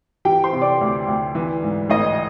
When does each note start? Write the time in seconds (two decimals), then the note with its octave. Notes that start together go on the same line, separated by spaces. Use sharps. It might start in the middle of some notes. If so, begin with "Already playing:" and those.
0.25 E3 G4 G5
0.44 C5 C6
0.52 C3
0.61 D5 D6
0.81 D2
1.07 D2
1.35 E3
1.62 G#2
1.90 A1 D#5 D#6